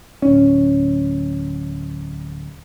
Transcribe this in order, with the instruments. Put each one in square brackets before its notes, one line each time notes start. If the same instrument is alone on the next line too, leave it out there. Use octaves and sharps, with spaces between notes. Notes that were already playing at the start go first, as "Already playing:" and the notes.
[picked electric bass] D1 C#4